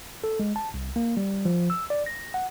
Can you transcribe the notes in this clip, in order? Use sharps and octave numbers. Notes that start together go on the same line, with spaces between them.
A4
G#3
A5
C2
A#3
G3
F3
E6
D5
A#6
F#5